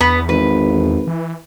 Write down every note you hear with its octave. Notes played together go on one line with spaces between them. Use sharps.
E2 B3
G#1 B4
E3